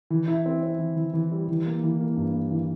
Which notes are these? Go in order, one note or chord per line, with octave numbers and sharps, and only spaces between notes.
E3
E4
C4
C4
E3
E3
E3
G3
E3
A#3
E3
A#3
G2
A#3
E3